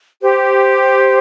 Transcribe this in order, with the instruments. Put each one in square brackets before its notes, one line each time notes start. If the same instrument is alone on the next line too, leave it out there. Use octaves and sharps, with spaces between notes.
[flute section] G4 [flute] C5